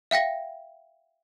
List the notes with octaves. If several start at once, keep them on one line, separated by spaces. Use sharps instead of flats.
E5 F5 G5 A#6